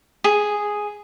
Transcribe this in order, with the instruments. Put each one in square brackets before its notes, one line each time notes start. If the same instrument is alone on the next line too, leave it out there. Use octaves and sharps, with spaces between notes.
[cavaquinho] G#4